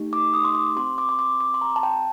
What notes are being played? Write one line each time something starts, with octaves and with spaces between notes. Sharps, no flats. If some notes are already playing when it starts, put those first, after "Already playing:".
Already playing: A3 D#4 G4
D6
D#6
C6
D6
C4 G4 C6
D6
C6
D6
D6
C6
A#5
A5
G5